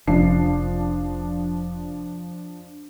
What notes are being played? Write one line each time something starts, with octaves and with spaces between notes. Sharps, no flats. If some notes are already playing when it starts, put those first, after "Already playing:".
F1 F3 C#4 D4 C7